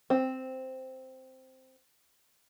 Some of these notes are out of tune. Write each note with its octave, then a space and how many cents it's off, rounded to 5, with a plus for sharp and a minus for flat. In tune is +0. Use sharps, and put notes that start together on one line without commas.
C4 -5